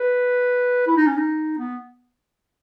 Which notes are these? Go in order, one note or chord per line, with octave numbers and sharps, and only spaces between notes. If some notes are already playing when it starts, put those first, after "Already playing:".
Already playing: B4
E4
D#4
C#4
D#4
B3